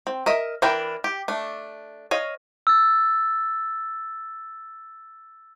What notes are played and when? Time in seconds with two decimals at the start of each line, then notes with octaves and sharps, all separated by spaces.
0.07 C4
0.26 A#4 D#5 E5
0.62 E3 D4 E4 A#4 G5
1.04 G4
1.28 A3 D4
2.11 C#5 D#5 F5
2.67 E6 A6